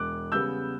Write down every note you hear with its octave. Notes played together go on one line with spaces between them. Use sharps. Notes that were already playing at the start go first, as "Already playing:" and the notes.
Already playing: E1 D6 F#6
E2 C#3 G3 B3 E6 G6